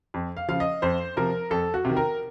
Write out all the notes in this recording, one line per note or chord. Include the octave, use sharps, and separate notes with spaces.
F2
F5
C#3 F3 F5
D#5
F2 C5
C3 F3 A#4
F2 A4
F#4
C3 D#3
A#4